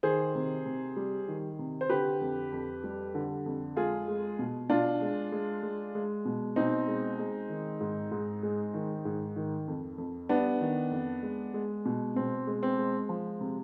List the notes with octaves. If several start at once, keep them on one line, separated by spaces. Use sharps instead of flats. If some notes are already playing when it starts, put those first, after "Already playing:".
D#3 G#4 C5
C3
C3
G3
D#3
C3
C5
D3 G4 B4
F2
F2
G3
D3
F2
G#3 F4 G#4
G#3
B2
B2 D4 F4
G#3
G#3
G#3
G#3
B2
B2 C4 D#4
G#3
G#3
D#3
G#2
G#2
G#3
D#3
G#2
D#3
F2
F2
G3 B3 D4
D#3
F2
G#3
G#3
B2
B2 C4
G#3
C4
G#3
F3
C3